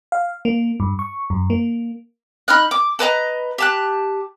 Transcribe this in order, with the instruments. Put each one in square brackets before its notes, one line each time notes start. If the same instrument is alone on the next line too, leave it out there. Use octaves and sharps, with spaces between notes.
[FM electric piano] F5
A#3
G2
C#6
F#2
A#3
[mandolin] D#4 B5 F6 F#6
D6
A4 B4 D#5 A#5
G4 A5 F#6